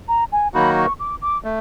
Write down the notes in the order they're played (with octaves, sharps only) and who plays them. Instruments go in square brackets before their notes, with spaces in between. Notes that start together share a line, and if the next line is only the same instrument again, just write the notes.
[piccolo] A#5
G#5
[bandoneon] D#3 F#3 A#3 D#4 F#4 [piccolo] B5
[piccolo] C#6
D6
D6
[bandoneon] A3